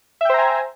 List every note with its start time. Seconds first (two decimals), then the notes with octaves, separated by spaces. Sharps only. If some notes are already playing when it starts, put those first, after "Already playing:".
0.21 E5
0.25 G5
0.30 C5
0.34 A#5
0.38 G#5